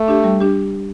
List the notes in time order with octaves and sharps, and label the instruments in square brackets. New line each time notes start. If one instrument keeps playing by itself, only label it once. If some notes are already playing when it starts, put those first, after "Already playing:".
Already playing: [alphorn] A3
[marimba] D4 G4
G3
D4 G4